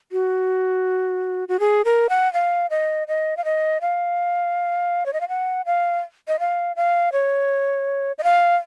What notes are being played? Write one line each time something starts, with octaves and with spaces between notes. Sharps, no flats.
F#4
F#4
G#4
A#4
F#5
F5
D#5
D#5
F5
D#5
F5
C#5
D#5
F5
F#5
F5
D#5
F5
F5
C#5
D#5
F5